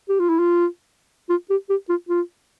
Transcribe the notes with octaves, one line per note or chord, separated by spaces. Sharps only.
G4
F4
E4
F4
F4
G4
G4
F4
F4